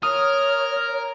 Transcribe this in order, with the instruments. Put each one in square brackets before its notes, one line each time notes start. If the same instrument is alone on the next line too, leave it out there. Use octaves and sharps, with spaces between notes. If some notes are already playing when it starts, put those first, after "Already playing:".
[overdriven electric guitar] A#4 [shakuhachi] C#5 [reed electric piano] D#6 [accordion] F6